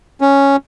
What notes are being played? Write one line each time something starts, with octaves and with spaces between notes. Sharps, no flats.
C#4